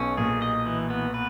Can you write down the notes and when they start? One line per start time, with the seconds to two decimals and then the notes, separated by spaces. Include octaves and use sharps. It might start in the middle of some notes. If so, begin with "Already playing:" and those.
Already playing: B1 B2 C#4
0.17 A#2 G#4
0.42 D#5
0.66 E3
0.90 B3
1.14 B4